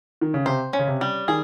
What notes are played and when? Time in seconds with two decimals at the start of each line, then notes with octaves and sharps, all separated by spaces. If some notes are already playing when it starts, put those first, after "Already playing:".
0.21 D#3
0.34 C#3
0.46 C3 C5
0.73 C#4
0.79 C#3
0.87 C3
1.01 G3
1.28 D#3 G#4